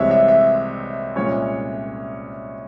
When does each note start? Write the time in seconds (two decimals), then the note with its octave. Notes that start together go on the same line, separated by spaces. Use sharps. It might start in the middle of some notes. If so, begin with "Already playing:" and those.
Already playing: C2 C3 E3 G#3 C4 C#5 E5
0.11 E5
0.28 E5
1.16 C2 A#2 G#3 C#4 F4 C#5